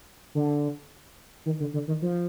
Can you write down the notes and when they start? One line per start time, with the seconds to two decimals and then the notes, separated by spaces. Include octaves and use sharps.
0.35 D3
1.46 D#3
1.60 D3
1.74 D3
1.88 D#3
2.02 F3